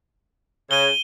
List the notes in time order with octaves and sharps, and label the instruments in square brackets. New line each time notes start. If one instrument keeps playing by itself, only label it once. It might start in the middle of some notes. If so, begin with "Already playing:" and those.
[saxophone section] C#3 [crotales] D#7 G7